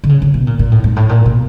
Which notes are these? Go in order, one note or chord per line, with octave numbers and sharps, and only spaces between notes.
D3
C#3
C#3
B2
A#2
A#2
A2
G#2
A2
A#2
B2